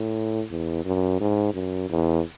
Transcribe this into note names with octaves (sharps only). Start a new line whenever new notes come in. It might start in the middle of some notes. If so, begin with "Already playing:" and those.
Already playing: A2
E2
F#2
G#2
F#2
E2